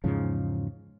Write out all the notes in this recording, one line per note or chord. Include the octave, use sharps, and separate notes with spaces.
E2 G#2 C#3 F3